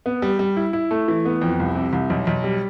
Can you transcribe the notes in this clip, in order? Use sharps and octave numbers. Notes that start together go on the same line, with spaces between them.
B3
G3
G3
E4
E4
A3
E3
B3
F2
C2
C3
C2
B1
B1
G3